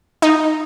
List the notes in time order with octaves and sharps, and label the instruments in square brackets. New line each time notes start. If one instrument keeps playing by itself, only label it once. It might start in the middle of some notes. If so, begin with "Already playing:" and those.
[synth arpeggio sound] D#4